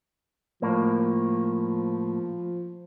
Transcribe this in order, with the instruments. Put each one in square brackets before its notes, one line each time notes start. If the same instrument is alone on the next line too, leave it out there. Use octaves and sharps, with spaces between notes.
[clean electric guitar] A2 A#3 [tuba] F3